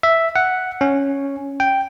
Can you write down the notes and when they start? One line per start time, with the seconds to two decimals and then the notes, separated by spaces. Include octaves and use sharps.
0.03 E5
0.36 F#5
0.81 C#4
1.60 G5